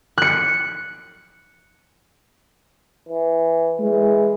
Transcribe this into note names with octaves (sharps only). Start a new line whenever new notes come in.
F#6 C#7
E3
E3 G#3